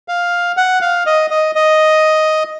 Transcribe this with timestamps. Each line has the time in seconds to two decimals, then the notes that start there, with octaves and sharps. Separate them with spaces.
0.08 F5
0.57 F#5
0.81 F5
1.06 D#5
1.30 D#5
1.55 D#5